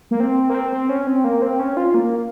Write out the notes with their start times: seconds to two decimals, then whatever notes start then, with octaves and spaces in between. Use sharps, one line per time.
0.11 A#3
0.20 C4
0.50 A#3
0.54 C4
0.72 C4
0.89 C#4
1.07 C4
1.24 A#3
1.42 C4
1.59 C#4
1.77 F4
1.94 A#3